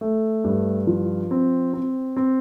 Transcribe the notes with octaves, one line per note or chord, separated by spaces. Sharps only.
A3
G2
F3
C4
C4
C4